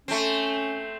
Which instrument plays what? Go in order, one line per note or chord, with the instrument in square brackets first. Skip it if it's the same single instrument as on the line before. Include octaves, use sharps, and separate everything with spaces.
[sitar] A3 C4 [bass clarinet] C#4